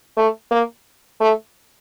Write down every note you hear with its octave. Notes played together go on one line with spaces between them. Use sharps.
A3
A#3
A3